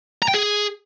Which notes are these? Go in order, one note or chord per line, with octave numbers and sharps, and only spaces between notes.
A#5
G5
G#4